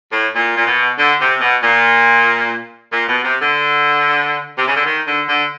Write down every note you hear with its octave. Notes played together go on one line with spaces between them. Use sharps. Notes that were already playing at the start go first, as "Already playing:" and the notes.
A2
A#2
A#2
B2
D3
C3
B2
A#2
A#2
B2
C3
D3
C3
C#3
D3
D#3
D3
D3